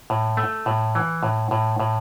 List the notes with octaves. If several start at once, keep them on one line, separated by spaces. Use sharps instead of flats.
A2
A3
A2
E3
A2
A2
A2